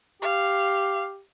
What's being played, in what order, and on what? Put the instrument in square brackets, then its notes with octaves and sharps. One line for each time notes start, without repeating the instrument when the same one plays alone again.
[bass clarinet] G4 [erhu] F5